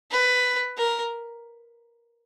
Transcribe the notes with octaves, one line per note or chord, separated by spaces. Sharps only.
B4
A#4